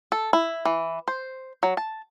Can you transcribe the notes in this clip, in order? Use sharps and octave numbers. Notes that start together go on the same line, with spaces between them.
A4
E4
E3
C5
F#3
A5